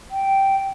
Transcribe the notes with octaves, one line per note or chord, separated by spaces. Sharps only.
G5